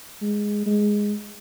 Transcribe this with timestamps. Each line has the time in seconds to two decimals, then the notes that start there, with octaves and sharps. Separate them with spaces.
0.22 G#3
0.66 G#3